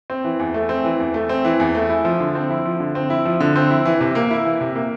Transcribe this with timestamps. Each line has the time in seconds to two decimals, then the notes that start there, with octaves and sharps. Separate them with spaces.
0.10 C4
0.24 E3
0.39 E2
0.54 A3
0.69 C4
0.85 E3
0.99 E2
1.14 A3
1.29 C4
1.45 E3
1.60 E2
1.75 A3
1.90 E4
2.05 F3
2.20 D3
2.35 C4
2.50 E4
2.65 F3
2.80 D3
2.95 C4
3.10 E4
3.25 F3
3.40 D3
3.56 C4
3.70 E4
3.85 E3
4.00 C3
4.15 A#3
4.31 E4
4.45 E3
4.61 C3
4.76 A#3